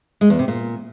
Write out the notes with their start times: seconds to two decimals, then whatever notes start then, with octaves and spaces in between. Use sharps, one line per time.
0.21 G#3
0.30 E2
0.39 C3
0.48 A#2